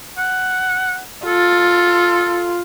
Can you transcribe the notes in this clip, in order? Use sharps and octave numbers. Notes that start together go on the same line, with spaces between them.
F#5
F4 A4